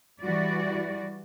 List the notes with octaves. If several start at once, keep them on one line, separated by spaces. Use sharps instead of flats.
E3 G3 F#4 D5